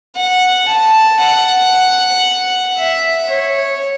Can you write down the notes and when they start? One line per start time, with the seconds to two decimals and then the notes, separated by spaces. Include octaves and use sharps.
0.16 F#5
0.68 A5
1.20 F#5
2.78 E5
3.30 C#5